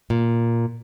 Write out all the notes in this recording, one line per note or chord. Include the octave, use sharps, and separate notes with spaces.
A#2